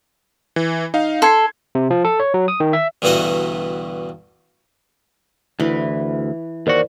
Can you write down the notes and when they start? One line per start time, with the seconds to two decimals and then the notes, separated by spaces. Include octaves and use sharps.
0.56 E3
0.94 D#4 F5
1.22 A4 C6 G#6 C7
1.75 C3
1.90 F3
2.05 A4
2.20 C#5
2.34 F#3
2.48 D#6
2.60 D#3
2.73 E5
3.02 D2 G2 B2 E3 F#4 D#5
5.60 D2 E3 B4
6.67 D#2 F#4 A#4 C5 D5